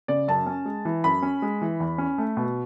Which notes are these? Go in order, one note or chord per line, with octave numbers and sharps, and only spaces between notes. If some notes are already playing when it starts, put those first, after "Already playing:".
C#3 D5
F#2 A5
C#4
G#3
E3
F#2 B5
C#4
G#3
E3
E2
C#4
A3
B2